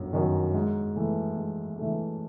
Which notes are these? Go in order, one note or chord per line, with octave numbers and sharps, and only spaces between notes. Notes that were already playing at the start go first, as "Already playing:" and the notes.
Already playing: G1 F#2
F#2 D#3
G#2
E3 A3
G#2
E3 A3